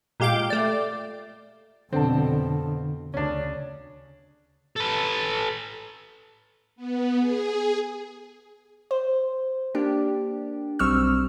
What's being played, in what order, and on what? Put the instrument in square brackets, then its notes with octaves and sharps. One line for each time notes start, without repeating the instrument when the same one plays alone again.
[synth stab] A#2 G#3 G4 F5 D6 G6
A3 D5
[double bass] F2 B2 [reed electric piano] D3 [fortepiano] C4 A4
[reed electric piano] D2 [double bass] C#3 [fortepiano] C#4 D4
[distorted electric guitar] A4 B4
[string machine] B3
G#4
[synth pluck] C5
A#3 D4 G4
B1 G3 C4 C#6 E6 F6